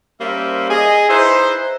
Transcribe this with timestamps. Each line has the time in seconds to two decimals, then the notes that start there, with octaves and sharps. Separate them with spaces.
0.21 G3 A#3 C#4 A#4 C5 E5
0.70 G#4 D#5
1.09 D#4 E4 G#4 B4 C5